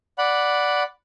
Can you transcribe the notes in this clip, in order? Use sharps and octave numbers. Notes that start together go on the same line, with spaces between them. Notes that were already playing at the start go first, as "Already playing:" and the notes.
D5 F#5 B5